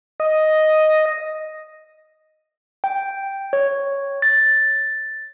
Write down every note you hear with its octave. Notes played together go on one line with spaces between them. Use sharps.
D#5
G5
C#5
A6